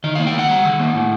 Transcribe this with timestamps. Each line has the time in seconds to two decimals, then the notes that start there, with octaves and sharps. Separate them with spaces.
0.04 D#3 D#5
0.15 A#3 F5
0.27 G5
0.34 D#3 F#5
0.49 G3
0.65 D#3
0.79 A#3
0.95 A2